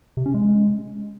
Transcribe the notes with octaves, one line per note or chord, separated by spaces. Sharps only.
C3
C#4
G#3